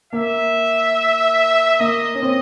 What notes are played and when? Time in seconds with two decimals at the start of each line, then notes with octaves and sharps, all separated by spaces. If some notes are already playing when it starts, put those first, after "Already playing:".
0.13 A#3 E5
1.80 A#3 D#5
2.15 C#4
2.22 C4